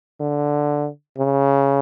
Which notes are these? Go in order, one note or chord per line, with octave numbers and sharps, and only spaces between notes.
D3
C#3